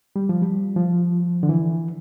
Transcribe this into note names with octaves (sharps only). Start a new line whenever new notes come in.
G3
F3
G3
F3
D3
E3